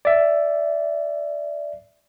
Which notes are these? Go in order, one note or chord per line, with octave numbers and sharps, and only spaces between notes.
D5 E5